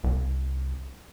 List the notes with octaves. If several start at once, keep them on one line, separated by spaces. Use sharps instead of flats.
C2